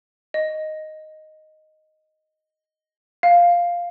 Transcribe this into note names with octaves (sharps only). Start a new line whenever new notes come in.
D#5
F5